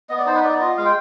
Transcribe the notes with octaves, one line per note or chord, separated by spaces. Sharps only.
B3 D#5
D5
D#4 C5
B4
B3 D5
F4 D#5
G#3 F5
G5